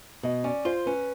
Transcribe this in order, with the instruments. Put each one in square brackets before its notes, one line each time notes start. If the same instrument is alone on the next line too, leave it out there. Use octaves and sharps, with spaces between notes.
[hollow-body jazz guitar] B2 [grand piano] D#5
[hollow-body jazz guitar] C#4 [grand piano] D5
[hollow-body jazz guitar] F4 [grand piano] C5
[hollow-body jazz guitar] C#4 [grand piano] B4